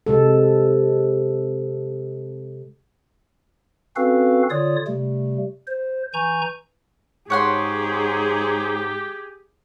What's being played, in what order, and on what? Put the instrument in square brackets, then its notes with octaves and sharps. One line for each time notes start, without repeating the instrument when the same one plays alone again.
[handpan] C3 G#3 A4
[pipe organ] C4 C#4 F#4 A4 B4 F5
D3 F4 C#5 D5 D#6
C3 G3 A3
C5
E3 G#5 A#5 C#6 G6
[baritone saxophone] G#2 [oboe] G4 [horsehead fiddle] G#4 [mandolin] C#5 F#5 C6